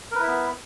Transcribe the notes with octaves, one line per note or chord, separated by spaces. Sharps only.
B3 E4 A#4 B4 E5